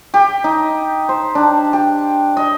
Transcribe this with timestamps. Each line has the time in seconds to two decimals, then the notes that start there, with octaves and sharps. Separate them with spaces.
0.14 G4
0.44 D#4
1.09 C5
1.35 D4
1.73 G4
2.37 D#5